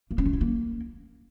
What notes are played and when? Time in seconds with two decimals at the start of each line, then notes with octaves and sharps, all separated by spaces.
0.11 A#3
0.18 C#4
0.26 A3
0.33 E4
0.41 A#3